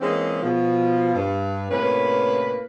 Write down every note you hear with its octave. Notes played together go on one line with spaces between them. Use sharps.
E3 G#3 A#3 C4 C#4 D#4
B2 F3
G2
A2 C3 A#3 C#4 B4